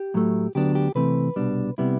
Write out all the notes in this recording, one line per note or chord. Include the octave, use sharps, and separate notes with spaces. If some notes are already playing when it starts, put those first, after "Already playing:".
Already playing: G4
A2 F#3 A3
D2 D3 F#3 B3 D4 G4
G4
C3 E3 A3 C4 B4
C2 B2 G3 D4
C3 G3 B3 E4